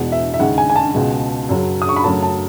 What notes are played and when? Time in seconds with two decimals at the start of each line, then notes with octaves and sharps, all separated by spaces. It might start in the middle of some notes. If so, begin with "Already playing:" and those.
Already playing: E2 B2 G#3 F#5
0.12 E5
0.34 E5
0.39 D#2 C#3 G#3 F#5
0.58 G#5
0.70 G#5
0.76 A5
0.94 C#2 B2 G#3
1.49 F#2 C#3 F#3
1.82 D#6
1.89 C#6
1.96 B5
2.04 F#2 C#3 F#3 A3 A5
2.23 A5